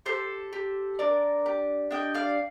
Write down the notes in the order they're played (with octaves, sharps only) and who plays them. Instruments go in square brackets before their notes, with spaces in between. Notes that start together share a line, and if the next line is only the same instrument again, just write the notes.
[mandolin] G4 A4 C5
G4
D4 A#4 D5
G4
D4 D#5 G5
D5 F5